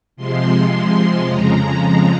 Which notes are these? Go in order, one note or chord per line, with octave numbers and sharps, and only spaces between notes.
C3 F3 G#3 C6
F2 C#3 F3 G#3 A#5